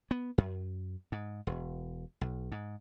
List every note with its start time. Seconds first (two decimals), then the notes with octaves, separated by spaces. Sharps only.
0.11 B3
0.38 F#2
1.12 G#2
1.47 E1
2.21 B1
2.52 G#2